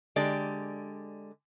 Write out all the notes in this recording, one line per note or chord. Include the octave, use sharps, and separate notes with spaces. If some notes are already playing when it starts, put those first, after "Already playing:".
D3 G#3 G4 D5